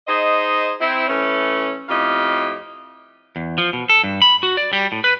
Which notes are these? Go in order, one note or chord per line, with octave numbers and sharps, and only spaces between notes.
D#4 G#4 C5 D#5
C4 E4
E3 A3 C#4
F2 A2 G4 D#5 F5
E2
F3
B2
A4
G2
B5
F#4
D5
G3
A2
B4